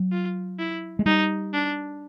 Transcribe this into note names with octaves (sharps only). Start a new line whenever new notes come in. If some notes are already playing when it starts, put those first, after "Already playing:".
Already playing: F#3
F4
E4
G#3
G3 D#4
D4